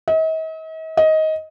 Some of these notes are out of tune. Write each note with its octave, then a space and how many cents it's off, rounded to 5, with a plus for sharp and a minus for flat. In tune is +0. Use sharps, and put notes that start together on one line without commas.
D#5 +45
D#5 +15